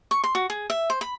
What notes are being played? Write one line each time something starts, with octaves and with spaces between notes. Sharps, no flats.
C#6
C6
F#4
G#4
E5
C5
B5